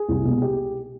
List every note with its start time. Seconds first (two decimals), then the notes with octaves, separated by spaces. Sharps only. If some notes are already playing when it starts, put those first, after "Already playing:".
Already playing: G#4
0.08 C2
0.25 B2 G#3 B3
0.42 G4